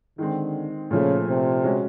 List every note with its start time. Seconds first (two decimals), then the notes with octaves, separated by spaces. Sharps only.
0.18 D3 D#3 G#3 C4
0.91 A#2 C#3 F3 A3
1.27 C3
1.64 G#3 C#4 F#4